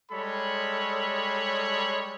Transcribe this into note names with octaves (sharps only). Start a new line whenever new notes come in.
G3 G#3 A4 C#5 B5